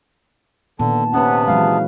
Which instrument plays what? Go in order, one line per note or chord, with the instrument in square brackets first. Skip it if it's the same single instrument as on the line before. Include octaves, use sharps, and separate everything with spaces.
[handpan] A#2 D#3 B3 [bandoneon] D3 [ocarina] A5
[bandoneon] C3 B3 [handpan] C#4 B4 [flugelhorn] F#5
[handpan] E3 F#3 G#3 [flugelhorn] F5